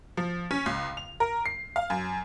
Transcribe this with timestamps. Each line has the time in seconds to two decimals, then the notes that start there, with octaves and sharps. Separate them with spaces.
0.17 F3
0.51 C#4
0.66 C#2
0.97 F7
1.20 A#4
1.46 C7
1.76 F5
1.90 F#2